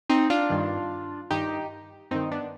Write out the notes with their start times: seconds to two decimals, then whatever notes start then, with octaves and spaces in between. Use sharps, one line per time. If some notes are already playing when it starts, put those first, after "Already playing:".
0.10 C4 D#4
0.30 D4 F4
0.50 G2 D#3
1.31 G2 D#3 D#4 G4
2.11 G2 D#3 C4 D#4
2.31 B3 D4